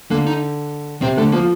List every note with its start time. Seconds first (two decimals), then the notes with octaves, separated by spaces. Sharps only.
0.11 D3 A#3
0.27 D#4
1.02 C3 C4
1.17 D3 A3
1.32 F3 A#3